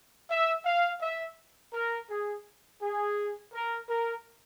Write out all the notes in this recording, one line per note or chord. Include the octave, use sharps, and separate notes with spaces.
E5
F5
E5
A#4
G#4
G#4
A#4
A#4